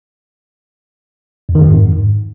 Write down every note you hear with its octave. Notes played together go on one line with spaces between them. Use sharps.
F2
D#3
F2
G#2